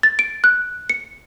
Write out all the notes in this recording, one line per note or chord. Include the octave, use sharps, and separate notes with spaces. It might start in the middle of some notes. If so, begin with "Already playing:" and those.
A6
D7
F#6
C#7